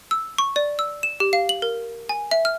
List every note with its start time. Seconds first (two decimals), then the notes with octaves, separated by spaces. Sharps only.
0.11 E6
0.38 C#6
0.56 D5
0.79 E6
1.03 E7
1.20 G4
1.33 F5
1.49 F#7
1.62 A#4
2.09 G#5
2.31 E5
2.45 F6